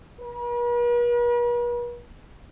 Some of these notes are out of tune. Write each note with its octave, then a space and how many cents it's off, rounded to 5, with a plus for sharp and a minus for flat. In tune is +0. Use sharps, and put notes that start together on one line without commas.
B4 -45